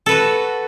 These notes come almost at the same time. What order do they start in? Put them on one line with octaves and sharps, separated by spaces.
A4 B4 F#4